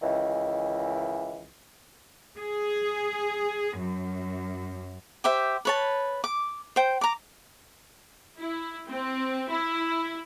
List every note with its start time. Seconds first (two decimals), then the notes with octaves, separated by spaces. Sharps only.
0.02 C#2 D#3 E3
2.38 G#4
3.78 F#2
5.24 G4 C5 E5
5.65 B4 C#5 A5
6.24 D6
6.76 C5 G5
7.01 A#5 D6
8.37 E4
8.88 C4
9.51 E4